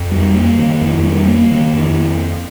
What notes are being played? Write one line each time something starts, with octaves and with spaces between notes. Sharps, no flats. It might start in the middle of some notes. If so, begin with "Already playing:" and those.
Already playing: F2
G3
A#3
D#3
F2
G3
A#3
D#3
F2